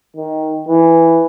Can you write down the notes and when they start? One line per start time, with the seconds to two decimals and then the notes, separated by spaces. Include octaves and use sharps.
0.16 D#3
0.69 E3